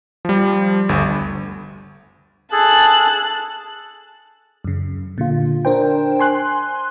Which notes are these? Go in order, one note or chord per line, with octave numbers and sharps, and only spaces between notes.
F3 G3
G1 D2
G#4 A4 A5 F#6
F#2 C#3
A#2 D3 F4
D4 A#4 C5 G5
G#5 C6 F#6